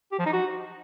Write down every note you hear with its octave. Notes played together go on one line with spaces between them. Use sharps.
G4
F3
D#4
F#4